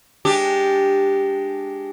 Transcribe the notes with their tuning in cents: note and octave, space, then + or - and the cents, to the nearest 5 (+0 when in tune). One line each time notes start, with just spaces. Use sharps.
G#3 +0 D4 +0 G4 +0